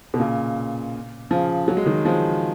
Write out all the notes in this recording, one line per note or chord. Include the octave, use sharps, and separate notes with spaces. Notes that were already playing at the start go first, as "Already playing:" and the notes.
B2
A#2 C#3
C#3 F3
F#3
G#3
D#3 F#3
F3 G#3